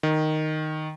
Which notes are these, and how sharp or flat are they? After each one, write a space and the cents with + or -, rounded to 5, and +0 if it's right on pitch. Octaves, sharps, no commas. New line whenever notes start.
D#3 -5